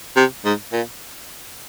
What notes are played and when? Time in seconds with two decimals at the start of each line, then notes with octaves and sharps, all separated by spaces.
0.16 C3
0.45 G#2
0.72 A#2